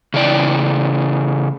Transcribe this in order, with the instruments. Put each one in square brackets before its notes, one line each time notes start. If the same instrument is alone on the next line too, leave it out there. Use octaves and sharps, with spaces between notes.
[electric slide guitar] C#3 E3 D5 G5